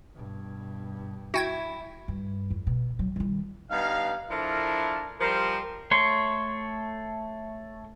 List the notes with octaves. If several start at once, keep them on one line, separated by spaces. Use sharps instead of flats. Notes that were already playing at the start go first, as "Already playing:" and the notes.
G2 B2
E4 F#4 G5 G#6
G2
F2
B2
F#3
D#3 G3
G2 B3 D#4 F5
F3 D4 E4 A4 A#4
F3 G3 A#4 C5
A3 C#5 C6